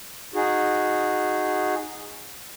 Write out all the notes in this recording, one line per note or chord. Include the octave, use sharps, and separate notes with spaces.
D#4 F#4 G#4